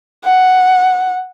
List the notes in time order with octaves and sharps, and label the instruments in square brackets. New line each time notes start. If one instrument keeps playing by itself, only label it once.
[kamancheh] F#5